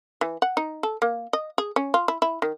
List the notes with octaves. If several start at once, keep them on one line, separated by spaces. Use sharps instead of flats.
E3
F#5
D#4
A4
A#3
D#5
G#4
C#4
F4
E4
E4
D#3